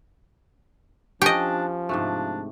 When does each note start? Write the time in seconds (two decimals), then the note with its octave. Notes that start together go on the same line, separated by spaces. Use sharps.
1.22 F3 C#4 D4 G4 D#5
1.89 G#2 C3 A3 D4